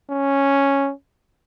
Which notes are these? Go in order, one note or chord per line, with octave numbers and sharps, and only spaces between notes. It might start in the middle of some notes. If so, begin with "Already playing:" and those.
C#4